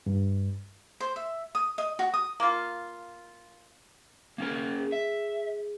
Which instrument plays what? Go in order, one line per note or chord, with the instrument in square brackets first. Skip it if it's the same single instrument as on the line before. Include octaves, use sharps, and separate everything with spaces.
[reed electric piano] G2
[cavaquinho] C5
E5
D#6
D#5
F#4
D#6
[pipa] A#3 F4
[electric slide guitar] A#3 C#4 A#4
[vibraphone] G#4
[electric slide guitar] E5